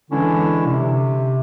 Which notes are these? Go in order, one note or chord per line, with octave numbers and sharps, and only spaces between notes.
D3 E3 G#3 C#4 D4 E4
C3